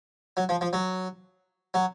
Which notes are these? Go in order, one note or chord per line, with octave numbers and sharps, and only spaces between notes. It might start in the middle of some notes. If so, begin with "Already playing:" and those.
F#3
F3
F3
F#3
F#3